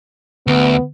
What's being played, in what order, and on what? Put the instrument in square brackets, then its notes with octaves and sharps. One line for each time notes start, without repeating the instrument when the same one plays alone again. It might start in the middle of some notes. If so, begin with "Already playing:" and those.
[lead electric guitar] D2 [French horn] B3